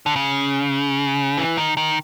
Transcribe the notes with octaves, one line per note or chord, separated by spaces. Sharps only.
D3
C#3
E3
D#3
D#3